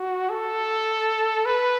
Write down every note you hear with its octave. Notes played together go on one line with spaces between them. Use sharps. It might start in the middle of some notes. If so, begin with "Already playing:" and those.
Already playing: F#4
A4
B4